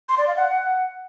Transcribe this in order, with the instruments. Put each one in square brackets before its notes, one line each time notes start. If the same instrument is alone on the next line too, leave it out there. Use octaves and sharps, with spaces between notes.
[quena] C6
D5
F5
F#5